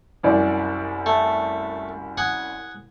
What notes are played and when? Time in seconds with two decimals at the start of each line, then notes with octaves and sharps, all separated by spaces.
0.23 C2 F#2 D5
1.06 A3
2.17 F#5 G#5 D#6